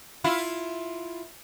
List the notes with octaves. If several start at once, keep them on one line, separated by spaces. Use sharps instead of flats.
E4 F4